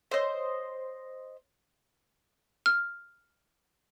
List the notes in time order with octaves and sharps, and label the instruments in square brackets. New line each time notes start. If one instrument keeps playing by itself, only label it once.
[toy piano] A4 A#4 C#5 [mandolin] C5 D#5
[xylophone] F6